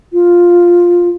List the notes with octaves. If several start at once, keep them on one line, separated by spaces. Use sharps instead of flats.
F4